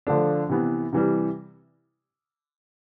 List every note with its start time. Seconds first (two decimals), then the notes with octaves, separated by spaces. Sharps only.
0.07 D3 F3 A3 D4
0.49 C3 E3 B3
0.93 C3 E3 G3